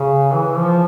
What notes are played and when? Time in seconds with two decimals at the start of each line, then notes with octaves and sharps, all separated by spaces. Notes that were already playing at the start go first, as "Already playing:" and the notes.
Already playing: C#3
0.33 E3
0.56 F3